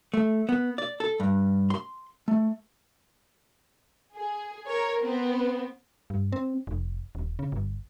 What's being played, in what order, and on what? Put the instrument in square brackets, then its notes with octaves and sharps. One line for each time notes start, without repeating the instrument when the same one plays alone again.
[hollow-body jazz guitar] A3
B3
D5
A4
G2
C6
A3
[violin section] G#4
A#4 C#5
B3 C4
[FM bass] G2
C4
F1
D#1
C#3
G1